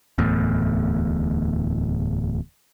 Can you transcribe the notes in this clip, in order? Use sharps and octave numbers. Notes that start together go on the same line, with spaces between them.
D1 E2 A2